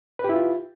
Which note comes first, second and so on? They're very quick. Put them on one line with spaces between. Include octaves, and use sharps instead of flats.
B4 G4 E4 F4